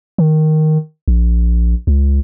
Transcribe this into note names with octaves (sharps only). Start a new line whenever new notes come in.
D#3
A#1
C#2